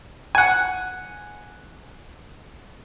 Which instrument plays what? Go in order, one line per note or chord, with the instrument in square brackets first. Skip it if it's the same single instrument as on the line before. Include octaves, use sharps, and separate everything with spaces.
[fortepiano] F#5 G#5